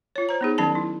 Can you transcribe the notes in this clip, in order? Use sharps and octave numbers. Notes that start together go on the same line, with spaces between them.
F4 C#5
C5 A#5
B3 D#4 G#4
D#3 F#3 C#4 A5 B5
E4